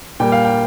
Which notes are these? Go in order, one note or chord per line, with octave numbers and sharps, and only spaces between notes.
A#2 G3 A#3 G5
F5
G5